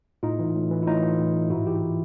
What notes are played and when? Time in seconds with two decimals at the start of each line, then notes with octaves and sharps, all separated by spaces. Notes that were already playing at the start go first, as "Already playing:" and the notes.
0.23 A2 D#4 F4
0.39 E3
0.55 A2
0.71 E3
0.83 E4
0.87 A2 D#4 F4
1.03 E3
1.19 A2
1.34 E3
1.50 G#2 E4 F#4
1.66 E3 F4 G4